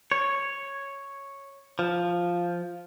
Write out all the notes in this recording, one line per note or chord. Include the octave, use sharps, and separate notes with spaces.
C#5
F3